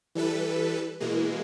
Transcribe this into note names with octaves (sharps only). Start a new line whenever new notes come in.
E3 G3 A4 B4
B2 E3 G#3 A#3